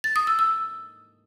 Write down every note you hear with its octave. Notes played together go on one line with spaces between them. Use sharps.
A6
D#6
E6
E6